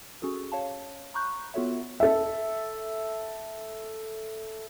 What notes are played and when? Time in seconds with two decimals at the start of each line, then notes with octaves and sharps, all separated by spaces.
0.22 C#4 F#4 G#4 A4
0.52 C#5 F5 A5
1.14 A#5 B5 C#6 F#6 G6
1.54 B3 F4 F#4 A4 C#5 E5
2.00 A4 E5